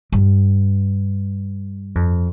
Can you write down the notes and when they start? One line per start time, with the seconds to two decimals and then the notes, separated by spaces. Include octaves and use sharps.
0.12 G2
1.95 F2